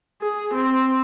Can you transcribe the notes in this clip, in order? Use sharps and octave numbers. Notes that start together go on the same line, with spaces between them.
G#4
C4